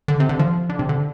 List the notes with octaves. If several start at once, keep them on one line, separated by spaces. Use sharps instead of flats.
D3
C3
D3
F3
D3
C3
D3